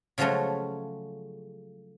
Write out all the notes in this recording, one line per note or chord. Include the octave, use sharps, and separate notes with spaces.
C#3 F3 F#3 G#3 A3 C#4